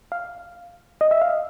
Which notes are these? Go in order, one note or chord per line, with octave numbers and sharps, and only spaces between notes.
F5
D#5
E5
F5